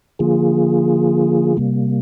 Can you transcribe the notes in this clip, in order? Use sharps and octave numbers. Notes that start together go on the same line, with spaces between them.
D3 F3 A#3 F4 G#4
C3 G3 A#3